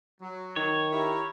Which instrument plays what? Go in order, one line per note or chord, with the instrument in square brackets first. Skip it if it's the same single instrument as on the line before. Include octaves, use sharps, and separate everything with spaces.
[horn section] F#3
[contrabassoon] D#3 [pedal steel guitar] C#5
[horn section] E4 G4 A#4